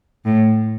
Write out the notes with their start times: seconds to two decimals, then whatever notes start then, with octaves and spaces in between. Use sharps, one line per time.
0.25 A2